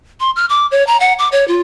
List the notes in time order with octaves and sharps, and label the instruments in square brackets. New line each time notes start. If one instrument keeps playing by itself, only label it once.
[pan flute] C6
F6
D6
C#5
A#5
F#5
D6
C#5
F4